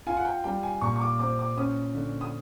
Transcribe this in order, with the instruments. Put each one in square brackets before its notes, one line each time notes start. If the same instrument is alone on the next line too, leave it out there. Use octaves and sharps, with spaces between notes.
[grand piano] F4 [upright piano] G#5
[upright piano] F#5
G5
[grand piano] G3 [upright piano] G5
[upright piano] G#5
[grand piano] A#2 [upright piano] C#6
[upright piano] C#6
D6
[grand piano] C4 [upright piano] D6
[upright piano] D6
[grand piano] C#4 [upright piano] D#6
[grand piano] D3
[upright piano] D#6